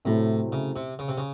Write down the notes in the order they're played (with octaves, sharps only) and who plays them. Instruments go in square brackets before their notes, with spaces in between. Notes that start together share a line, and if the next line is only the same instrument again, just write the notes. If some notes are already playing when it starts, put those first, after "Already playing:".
[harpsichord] A2 [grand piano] C3 F#3 A3 C4 E4
[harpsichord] C#3
C3
C#3
C3
C#3